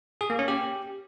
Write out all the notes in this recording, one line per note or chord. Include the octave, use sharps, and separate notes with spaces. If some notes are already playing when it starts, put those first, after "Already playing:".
G#4
A#3
C#4
G4